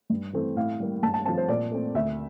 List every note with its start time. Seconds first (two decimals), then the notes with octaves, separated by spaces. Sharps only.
0.10 G2
0.33 E3 A3 C4
0.56 A2 F5
0.80 G3 A#3
1.03 G2 A5
1.14 A5
1.26 F3 A3 C4 A5
1.38 C5
1.49 A#2 D5
1.72 A3 C4
1.95 D2 E5